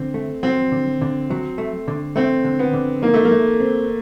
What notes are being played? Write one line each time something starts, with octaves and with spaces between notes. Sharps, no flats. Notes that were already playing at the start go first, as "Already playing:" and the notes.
Already playing: D3 C4
A3
F#3 C4
D3
D3
F#3
A3
D3
A3 C4
D3
B3
D3
A#3 D#4
A3
A#3
A3
C4